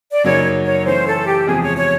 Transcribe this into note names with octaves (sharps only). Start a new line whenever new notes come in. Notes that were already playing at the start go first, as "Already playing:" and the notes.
D5
F#2 C#3 F#3 A#3 D#4 C#5
C#5
E3 A3 C#4 C5
A4
G4
E2 C3 F3 G#3 G#4
C#5
C#5